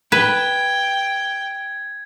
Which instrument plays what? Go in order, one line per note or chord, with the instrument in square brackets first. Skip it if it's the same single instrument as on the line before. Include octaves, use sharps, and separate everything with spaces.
[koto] B4 [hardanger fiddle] G5 [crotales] G#6